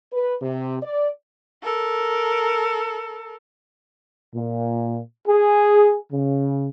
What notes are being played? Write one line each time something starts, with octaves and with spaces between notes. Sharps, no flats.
B4
C3
D5
A4 A#4
A#2
G#4
C#3